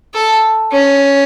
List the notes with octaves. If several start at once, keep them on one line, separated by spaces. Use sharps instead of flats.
A4
C#4